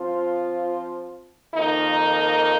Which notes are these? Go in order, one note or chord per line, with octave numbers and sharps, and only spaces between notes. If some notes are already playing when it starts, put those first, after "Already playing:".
Already playing: F3 C4 F4 C5
F2 D#3 A#3 D#4